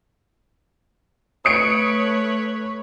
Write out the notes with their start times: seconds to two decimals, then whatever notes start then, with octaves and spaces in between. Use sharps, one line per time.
1.45 A3 B4 C#5 D#6 C#7 D7